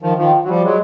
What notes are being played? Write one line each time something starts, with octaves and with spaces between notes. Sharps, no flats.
D#3 F3
D#3 F3
F#3
F3 G3
F#3 G#3